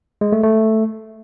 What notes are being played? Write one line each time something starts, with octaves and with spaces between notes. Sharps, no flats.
G#3
A3
A3